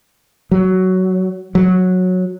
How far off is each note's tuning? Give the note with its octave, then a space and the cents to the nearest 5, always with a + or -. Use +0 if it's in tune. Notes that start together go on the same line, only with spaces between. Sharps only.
F#3 +10
F#3 -10